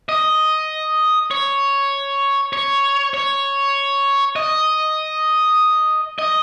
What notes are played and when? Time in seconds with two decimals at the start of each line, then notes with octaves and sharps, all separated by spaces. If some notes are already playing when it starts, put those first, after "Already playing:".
0.09 D#5
1.31 C#5
2.53 C#5
3.14 C#5
4.36 D#5
6.19 D#5